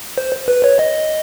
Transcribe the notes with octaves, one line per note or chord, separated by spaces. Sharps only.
C5
B4
C#5
D#5